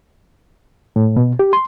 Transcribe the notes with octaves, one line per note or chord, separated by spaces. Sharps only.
A2
B2
G4
C6